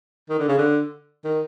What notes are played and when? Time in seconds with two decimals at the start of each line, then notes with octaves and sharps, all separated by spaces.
0.30 D#3
0.39 D3
0.49 C#3
0.58 D3
1.25 D#3